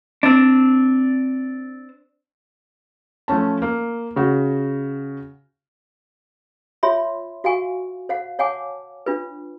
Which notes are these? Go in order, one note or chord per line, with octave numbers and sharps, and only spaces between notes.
C4 D4
F3 A3 C#4 A5
A#3
C#3 F#4
F4 C#5 E5 B5 C6
F#4 F5 F#5 G#5 C#6
C5 F5 F#5
C#5 F5 F#5 G#5 A5 D6
D4 F4 B4